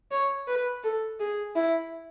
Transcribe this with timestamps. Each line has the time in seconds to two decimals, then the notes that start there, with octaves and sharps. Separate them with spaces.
0.12 C#5
0.48 B4
0.84 A4
1.20 G#4
1.56 E4